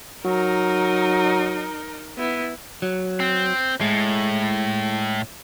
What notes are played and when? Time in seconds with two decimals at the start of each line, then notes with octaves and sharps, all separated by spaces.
0.25 F#3 D#4 A#4
2.18 B3 E4
2.82 F#3
3.20 C4
3.81 A2 G#3